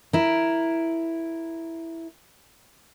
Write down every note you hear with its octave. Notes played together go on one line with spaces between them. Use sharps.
E4 A#4